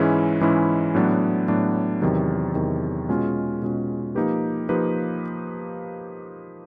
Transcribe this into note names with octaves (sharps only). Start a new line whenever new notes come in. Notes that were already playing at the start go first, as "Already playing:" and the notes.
Already playing: G#2 E3 G#3 C#4 E4
G#2 E3 G#3 C#4 E4
A2 F#3 B3 D4
A2 F#3 B3 D4
E2 C3 D#3 F#3
E2 C3 D#3 F#3
B2 G#3 C#4 F4
B2 G#3 C#4 F4
F3 A#3 D#4 G4 B4
F3 A#3 D#4 G4 B4